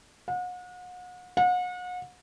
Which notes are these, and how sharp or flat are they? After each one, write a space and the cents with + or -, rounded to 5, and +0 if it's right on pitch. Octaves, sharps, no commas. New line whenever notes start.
F#5 -40
F#5 -40